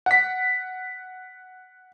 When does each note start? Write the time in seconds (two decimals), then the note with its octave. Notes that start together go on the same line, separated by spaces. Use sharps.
0.06 F#5 B6